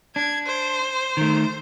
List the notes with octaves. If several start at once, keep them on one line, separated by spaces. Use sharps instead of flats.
D4 G#6
C5
D#3 A3